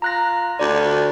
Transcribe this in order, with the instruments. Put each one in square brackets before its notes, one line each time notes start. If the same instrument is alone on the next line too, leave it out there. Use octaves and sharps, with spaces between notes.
[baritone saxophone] F4 [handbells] A#5 F#6 A#6
[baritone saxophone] D2 [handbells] D5